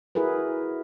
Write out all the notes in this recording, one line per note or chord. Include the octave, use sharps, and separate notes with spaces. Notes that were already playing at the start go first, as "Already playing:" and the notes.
E4 F#4 G#4 A#4 B4